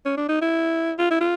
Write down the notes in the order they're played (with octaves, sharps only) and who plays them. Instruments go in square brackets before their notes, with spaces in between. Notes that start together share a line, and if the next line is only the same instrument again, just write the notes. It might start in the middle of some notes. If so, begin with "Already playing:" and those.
[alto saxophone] C#4
D4
D#4
E4
F4
E4
F4